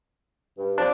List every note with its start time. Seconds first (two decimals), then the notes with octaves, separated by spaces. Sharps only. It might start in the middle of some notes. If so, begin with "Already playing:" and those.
0.58 G2
0.78 F3 C4 D4